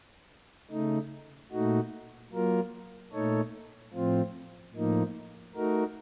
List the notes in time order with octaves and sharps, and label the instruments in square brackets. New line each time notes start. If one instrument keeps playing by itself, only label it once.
[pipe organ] C#3 A3 D#4
A#2 A3 D#4 F#4
F#3 A#3 F4 A#4
A#2 A3 D#4 A4 C#5
A2 F3 C4 F4
A2 F3 A#3 D#4
A3 D#4 F#4 A#4